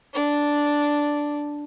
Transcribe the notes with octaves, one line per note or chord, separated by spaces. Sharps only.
D4 D5